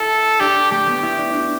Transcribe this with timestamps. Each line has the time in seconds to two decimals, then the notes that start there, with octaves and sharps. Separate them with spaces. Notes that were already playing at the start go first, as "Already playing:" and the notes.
Already playing: E4 A4
0.40 D4 G4
0.71 A3 G4
0.87 B3
1.03 E4
1.18 D4
1.33 D4